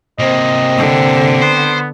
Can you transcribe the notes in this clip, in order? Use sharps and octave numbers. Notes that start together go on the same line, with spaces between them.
C3 A#3 C4 D#5
D3
B3 C5